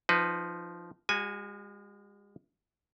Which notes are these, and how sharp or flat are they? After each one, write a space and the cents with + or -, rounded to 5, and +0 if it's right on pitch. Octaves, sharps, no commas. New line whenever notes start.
F3 +0 D#4 -10 B4 +20
G#3 -40 F#4 +0 G#5 +0